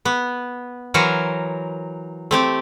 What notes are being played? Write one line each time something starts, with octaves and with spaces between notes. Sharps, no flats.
B3
E3 F#3 A#4 C5 C#5
A3 C4 G4